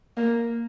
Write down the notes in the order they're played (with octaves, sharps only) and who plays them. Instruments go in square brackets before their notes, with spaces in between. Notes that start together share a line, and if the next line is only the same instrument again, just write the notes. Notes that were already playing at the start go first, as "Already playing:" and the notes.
[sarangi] A#3